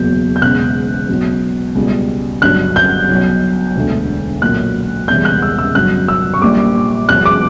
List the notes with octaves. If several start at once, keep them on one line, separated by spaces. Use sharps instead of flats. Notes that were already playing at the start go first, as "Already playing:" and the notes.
Already playing: F#1 E2 B2 F#3 G6
G6
E1 E2 C#3 F#6
B1 B2 F#3
C#2 B2 G3
G1 G2 F#3 F#6
G6
B1 B2 F#3
E1 D2 D3
B1 A#2 F#3 F#6
E1 E2 C#3 E3 G3 G6
F#6
E6
E6
G1 G2 F#3 F#6
E6
C#6
A#1 A#2 G3 D6
E1 E2 B2 F#3 F#6
D6